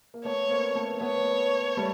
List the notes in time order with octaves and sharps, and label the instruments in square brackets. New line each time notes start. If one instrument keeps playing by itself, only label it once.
[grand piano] A#3
[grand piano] A3 B3 [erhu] C#5
[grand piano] A#3 C4
A3 B3
[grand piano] A3 B3 [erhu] C#5
[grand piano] G3 A3